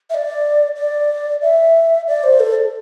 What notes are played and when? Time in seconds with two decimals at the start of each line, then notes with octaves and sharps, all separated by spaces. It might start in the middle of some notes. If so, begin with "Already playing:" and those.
0.10 E5
0.14 D5
0.76 D5
1.42 E5
2.07 D5
2.24 C5
2.40 A4